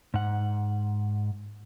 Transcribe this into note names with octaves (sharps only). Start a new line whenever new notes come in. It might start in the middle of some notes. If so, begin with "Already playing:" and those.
G#2 F#5